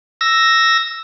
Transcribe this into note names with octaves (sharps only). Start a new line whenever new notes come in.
E6 A#6